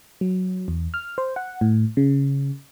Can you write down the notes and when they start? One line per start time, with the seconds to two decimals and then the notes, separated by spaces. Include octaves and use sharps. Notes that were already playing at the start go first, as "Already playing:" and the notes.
0.21 F#3
0.68 E2
0.94 F6
1.18 C5
1.36 F#5
1.61 A2
1.97 C#3